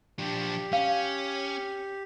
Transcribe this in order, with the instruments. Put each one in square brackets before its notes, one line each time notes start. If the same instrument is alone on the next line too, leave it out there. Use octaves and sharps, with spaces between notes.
[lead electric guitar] F3 D4 [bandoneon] G4
[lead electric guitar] C#4 [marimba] F5